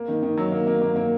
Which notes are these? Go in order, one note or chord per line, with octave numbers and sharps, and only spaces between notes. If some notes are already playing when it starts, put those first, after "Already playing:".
Already playing: A#3
D#3
D#3
F#3
A#3
A#3
A#3
A#3